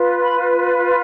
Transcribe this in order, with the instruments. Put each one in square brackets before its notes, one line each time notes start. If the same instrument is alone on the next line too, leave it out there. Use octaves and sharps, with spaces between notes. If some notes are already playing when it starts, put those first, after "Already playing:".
Already playing: [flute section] F4 B4
B5